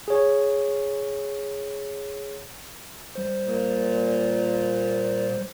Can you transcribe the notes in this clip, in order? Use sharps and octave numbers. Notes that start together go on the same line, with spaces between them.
G#4 C#5
G3 C5
A#2